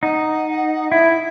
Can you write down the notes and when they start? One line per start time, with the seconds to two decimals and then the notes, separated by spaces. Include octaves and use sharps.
0.03 D#4 F#5
0.91 E4 E5